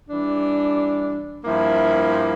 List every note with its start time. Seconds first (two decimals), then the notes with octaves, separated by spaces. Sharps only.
0.09 E3 G3 D4
1.45 G2 F3 A#3 E4